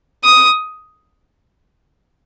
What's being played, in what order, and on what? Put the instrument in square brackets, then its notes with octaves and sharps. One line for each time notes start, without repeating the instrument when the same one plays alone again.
[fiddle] D#6